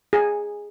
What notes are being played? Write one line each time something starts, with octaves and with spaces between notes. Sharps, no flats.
G#4